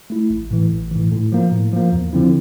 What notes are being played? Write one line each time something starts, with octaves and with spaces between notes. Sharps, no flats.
A3 E4
A1
A2 E3
A1
A2 E3
A2
F3 A#3
A2
F3 A#3
E2
D3 F3 C4 E4